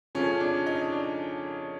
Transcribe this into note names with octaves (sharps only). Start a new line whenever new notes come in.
F2 C#3 F3 C#4
D4
D#4
D4